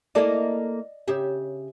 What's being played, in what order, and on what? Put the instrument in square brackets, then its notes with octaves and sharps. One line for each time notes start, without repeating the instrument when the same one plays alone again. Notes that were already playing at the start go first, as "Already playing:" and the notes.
[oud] A#3 E4 A4 [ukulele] D5 D#5
[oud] C#3 G4 E5